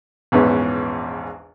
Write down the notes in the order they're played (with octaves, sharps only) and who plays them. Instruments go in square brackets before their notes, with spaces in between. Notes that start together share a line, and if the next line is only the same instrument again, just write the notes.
[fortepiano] A#1 E2 G#2 B3 C#4